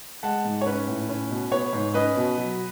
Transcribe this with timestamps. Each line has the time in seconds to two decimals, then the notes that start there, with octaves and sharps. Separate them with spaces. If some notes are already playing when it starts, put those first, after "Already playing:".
0.23 G#3 F#5 A5
0.44 G#2
0.61 C#5
0.66 C#4 B4
0.88 A2
1.09 C#4
1.30 B2
1.51 B3 C#5
1.73 G#2
1.94 C#4 B4 D#5
2.17 B2
2.37 F#3